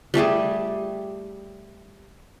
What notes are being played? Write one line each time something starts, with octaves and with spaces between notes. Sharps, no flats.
G3 A3 G4 G#4